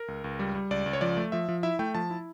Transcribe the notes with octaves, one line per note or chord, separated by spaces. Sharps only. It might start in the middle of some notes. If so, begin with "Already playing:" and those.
Already playing: A#4
C#2
C#2
G3
G3
C#2 D5
C#2
C#5
F3 D5
A3
F3 E5
F3
E4 E5
A3 G5
F3 A5
E4